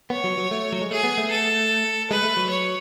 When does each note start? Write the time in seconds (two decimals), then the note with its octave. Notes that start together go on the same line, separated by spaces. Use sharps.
0.10 B3 C#5
0.24 F#3
0.38 F#3
0.51 A3
0.73 F#3
0.81 G#3
0.90 A3 G#4
1.04 B3
1.18 A3
1.30 A4
2.10 G#3 B4
2.23 A3
2.37 F#3
2.50 C#5